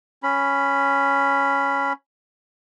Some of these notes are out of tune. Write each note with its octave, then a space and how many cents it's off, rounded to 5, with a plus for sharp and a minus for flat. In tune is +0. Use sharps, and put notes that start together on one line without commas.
C#4 +0 B5 +0